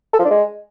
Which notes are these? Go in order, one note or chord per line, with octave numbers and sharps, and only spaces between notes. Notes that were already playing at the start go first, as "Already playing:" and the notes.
A4
F3
D4
G#3